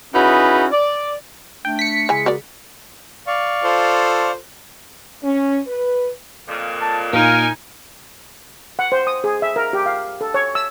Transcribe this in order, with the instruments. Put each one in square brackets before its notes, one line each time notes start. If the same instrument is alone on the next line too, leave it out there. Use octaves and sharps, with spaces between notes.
[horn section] C#4 D#4 E4 F#4 G#4 B4
D5
[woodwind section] A3 D4 [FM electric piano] G5
[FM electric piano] B6 C#7
[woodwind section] C#3 G#3 G#4 [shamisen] E3 G#5
[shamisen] F#4 A#4 D5
[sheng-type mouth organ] D5 F5 C#6
[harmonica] F4 A4 C5
[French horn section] C#4
B4
[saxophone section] F2 A#2
[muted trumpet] A5
[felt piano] A#2 [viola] D#4 G#5 [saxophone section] A#4 [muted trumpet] F5
[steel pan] F#5
C5
D#6
G#4
E5
A#4
G4
F5
A4
C#5
E6